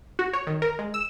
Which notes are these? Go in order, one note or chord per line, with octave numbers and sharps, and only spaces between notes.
F#4
C#5
D#3
A#4
G#3
E6